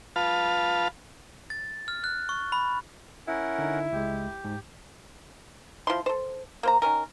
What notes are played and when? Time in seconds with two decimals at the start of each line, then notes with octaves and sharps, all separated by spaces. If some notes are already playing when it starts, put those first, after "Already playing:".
0.16 F4 B4 F5 A5
1.50 A6
1.88 F6
2.04 F#6
2.29 C#6
2.52 B5
3.28 C#4 E4 A#4 F#5
3.59 D3 D#4
3.92 C#2 G#3 G4
4.45 G#2
5.87 F3 E4 C6
6.06 A4 C5
6.63 A#3 C5 A#5
6.82 D#3 C#4 A#4